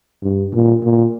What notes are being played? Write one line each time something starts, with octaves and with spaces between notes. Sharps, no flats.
G2
A#2
A#2